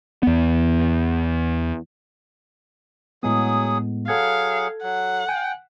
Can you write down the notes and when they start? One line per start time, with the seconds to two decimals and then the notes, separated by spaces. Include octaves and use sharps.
0.23 E2 B3
3.23 A2 F#3 G#3 B3 G#4 D#6
4.08 F#3 G#4 A4 F5 F#5 G#6
4.83 F#3 F#5
5.29 G5 G#5